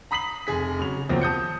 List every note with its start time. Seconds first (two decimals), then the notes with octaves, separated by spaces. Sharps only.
0.11 A#5 B5 D#6 B6 C7 F#7
0.47 F1 G#4 B6
0.79 C#3 F#3 F7
1.09 D#2 B2 F3 F#3 C4
1.21 A5 D#6 G6 C#7